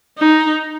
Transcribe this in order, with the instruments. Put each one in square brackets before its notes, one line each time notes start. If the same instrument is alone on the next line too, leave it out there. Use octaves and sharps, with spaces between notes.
[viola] D#4